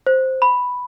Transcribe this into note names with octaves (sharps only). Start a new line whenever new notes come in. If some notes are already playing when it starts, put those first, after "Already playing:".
C5
B5